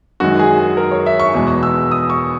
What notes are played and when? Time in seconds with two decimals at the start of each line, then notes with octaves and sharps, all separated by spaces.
0.20 F#2 D#3 G#3 F#4
0.39 G#4
0.59 G#4
0.77 A#4
0.91 C#5
1.06 E5
1.19 C#6
1.34 E2 B2 G#3 C#6
1.63 E6
1.91 D#6
2.10 C#6